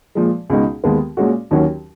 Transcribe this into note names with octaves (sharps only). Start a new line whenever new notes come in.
A#2 F3 G#3
C#2 B2 G#3 D#4 F#4
D#2 D#3 G#3 B3
A#2 G#3 C#4 F#4
D#2 D#3 F#3 C#4 F#4